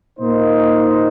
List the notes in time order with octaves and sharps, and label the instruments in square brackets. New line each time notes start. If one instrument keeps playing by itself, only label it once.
[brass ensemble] A#2 A#3 D#4 C5 D#5